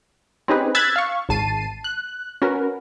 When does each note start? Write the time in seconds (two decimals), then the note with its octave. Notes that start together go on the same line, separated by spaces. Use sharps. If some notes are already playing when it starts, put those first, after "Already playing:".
0.48 C4 C#4 D#4 G4 G#4 B4
0.75 E6 F#6 G#6 A6 B6
0.96 F5 C#6
1.29 G#1 G#2 A5 C7 D#7
1.84 F#6
2.42 C#4 F#4 A#4 B4